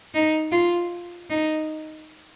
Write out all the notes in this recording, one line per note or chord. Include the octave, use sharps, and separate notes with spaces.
D#4
F4
D#4